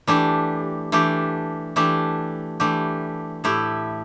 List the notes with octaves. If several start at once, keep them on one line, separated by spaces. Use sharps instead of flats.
E3 A3 D4 G4
E3 A3 D4 G4
E3 A3 D4 G4
E3 A3 D4 G4
A2 A3 E4 G4